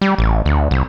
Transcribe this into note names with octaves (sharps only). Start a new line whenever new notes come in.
G3
A1
D2
C2